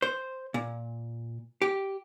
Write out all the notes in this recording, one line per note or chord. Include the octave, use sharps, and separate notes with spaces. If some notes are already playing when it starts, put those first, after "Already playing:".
C5
A#2
G4